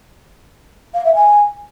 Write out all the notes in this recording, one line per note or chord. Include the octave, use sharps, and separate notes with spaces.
F5
E5
G#5